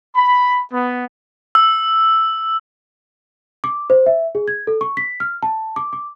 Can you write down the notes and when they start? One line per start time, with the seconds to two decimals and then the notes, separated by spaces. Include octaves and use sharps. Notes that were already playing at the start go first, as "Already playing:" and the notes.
0.16 B5
0.72 B3
1.55 E6
3.64 D6
3.90 C5
4.06 E5
4.35 G#4
4.48 G#6
4.67 A4
4.81 C#6
4.97 B6
5.20 F6
5.43 A5
5.76 D6
5.93 D6